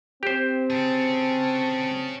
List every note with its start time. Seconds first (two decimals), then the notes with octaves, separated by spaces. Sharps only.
0.23 C4 G4 C5
0.70 C#4 G#4 A5